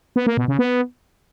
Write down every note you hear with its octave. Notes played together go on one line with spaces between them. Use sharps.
B3
A#3
B2
C#3
B3